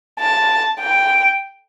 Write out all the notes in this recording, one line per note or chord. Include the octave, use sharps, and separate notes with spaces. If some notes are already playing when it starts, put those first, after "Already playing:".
A5
G5